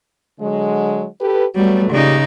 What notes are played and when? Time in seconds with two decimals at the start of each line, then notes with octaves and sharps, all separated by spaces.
0.40 D3 F#3 G#3
1.20 G4 A4 B4
1.56 F#3 G3 A3 B3 F#4
1.92 A#2 C#3 D#4 G4 D5